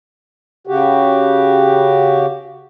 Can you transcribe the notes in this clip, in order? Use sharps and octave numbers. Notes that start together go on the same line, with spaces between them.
C#3 F#4 G4